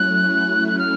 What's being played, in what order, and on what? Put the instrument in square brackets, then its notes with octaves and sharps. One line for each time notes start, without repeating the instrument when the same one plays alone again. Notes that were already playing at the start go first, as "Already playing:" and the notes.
Already playing: [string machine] F#3 A3 C#4 E4 [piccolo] F#6
[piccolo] F#6
F6